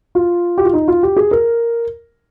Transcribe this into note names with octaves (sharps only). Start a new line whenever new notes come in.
F4
G4
F4
D#4
F4
G4
G#4
A#4